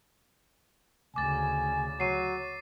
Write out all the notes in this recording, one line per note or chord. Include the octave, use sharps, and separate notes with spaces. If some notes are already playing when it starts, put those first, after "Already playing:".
D2 C#3 G#5 D6 A6
F#3 C7 D#7